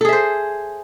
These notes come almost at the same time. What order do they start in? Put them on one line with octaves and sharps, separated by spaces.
A4 G#4 E5 C5